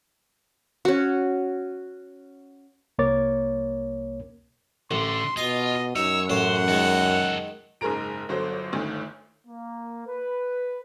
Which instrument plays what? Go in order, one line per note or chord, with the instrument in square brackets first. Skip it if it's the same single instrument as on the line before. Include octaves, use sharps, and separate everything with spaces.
[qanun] C#4 F#4
[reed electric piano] C2 A#3 A#4 C#5 D6 A6
[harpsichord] A1 [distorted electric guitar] D3 [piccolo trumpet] C6
[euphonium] B2 [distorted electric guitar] F4 [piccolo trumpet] D#5 [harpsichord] G#5
[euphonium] F#2 [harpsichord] D#4 [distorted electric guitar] C#5 [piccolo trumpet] E6
[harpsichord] A1 C#4 [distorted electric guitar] C5 [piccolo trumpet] F#5
[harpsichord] D#3 G#3 [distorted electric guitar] F#4 A4
[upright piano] F#1 G#2 G#4 A#4 A#5 D7
G1 D3 F#3 C5
G1 D2 D#3
[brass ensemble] A#3
B4